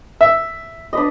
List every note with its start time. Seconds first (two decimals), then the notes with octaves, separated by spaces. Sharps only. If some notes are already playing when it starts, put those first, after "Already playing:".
0.21 E5
0.93 D4 B4 D#5